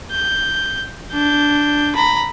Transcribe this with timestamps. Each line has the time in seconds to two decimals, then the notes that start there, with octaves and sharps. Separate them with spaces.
0.11 G6
1.13 D4 G6
1.96 A#5 B5